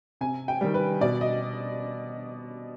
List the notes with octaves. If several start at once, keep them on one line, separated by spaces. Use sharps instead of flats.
C3 G#5
G5
D#3 G3
B4
B2 D5
D#5